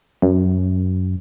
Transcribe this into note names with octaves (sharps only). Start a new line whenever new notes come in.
F#2